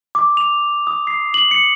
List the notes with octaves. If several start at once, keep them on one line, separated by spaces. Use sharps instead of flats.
D6
F7
D#6
C7
F#7
C#7